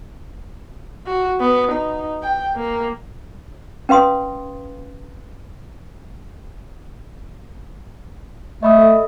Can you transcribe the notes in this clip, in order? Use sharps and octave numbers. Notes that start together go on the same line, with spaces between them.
F#4
B3
D#4
G5
A#3
C#4 B4 F5 C6 D#6
A3 D#5 B5 D#6
A4 E5